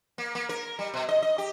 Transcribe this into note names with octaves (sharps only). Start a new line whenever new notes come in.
A#3
A#3
A#4
G3
B2
D#5
D#5
G4